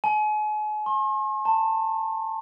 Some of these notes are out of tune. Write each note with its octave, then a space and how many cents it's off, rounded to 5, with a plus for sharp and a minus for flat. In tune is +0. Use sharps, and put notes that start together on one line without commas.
G#5 +40
C6 +45
A5 +25